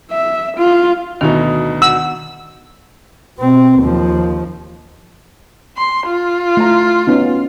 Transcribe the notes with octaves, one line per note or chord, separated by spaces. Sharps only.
E5
F4
D2 B2 D#3 B3 D#4
F#5 E6
B2 C4
D#2 F3
C6
F4
A3 A#5
B3 C#4 D#4